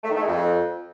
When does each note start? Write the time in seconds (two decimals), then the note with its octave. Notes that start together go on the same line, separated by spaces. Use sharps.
0.03 A3
0.10 D#3
0.16 A3
0.22 G#3
0.28 F2